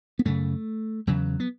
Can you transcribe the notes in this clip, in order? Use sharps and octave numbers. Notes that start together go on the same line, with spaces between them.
B3
F#2 C#3 A3
E2 C#3 F#3
B3